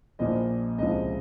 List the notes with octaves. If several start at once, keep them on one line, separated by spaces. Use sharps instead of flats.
A#1 A#2 F3 D#5
C#2 C3 F3 D#5